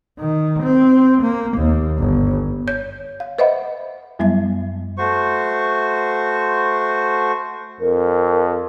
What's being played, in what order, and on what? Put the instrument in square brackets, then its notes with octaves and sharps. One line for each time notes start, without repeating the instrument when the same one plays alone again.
[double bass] D#3
C4
A#3
D#2
G1
[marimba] C#5 G6
F5
B4 C5 D#5 E5 F#5 B5
F#2 F#3 G3 B3 E5
[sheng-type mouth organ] A3 F#4 C5 C#6
[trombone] F2 [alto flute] A#4